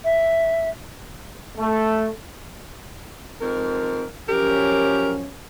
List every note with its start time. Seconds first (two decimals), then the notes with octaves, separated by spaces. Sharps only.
0.04 E5
1.57 A3
3.40 F2 G#2 A#4
4.29 F#2 F3 C#4 G4 A#4